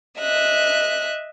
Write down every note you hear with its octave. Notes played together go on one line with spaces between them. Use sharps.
D#5 E5 F#6